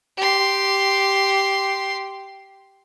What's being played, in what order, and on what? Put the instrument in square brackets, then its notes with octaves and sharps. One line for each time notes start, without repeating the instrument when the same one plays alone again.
[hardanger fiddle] G4 C6